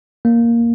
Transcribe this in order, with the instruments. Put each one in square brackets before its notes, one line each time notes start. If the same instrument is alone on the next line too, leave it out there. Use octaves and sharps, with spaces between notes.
[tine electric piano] A#3